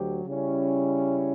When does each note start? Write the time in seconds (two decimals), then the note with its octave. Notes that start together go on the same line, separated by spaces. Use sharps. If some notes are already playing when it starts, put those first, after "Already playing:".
Already playing: D2 F#3 G4
0.25 C#3 G3 C#4 E4